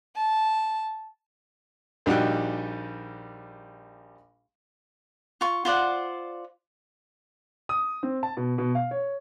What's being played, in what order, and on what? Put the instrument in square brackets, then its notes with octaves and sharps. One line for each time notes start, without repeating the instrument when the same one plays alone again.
[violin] A5
[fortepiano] A#1 G3 D#4 F#4 G5 F#6
[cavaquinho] F4 C#6
F4 C5 D5 F#5
[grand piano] D#6
C4
A5
B2
B2
F5
C#5